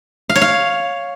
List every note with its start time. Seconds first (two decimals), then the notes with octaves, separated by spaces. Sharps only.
0.30 F5
0.36 C#5
0.42 F5